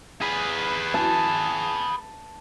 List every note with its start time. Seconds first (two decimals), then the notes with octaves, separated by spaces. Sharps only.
0.22 G#4 B4
0.94 A5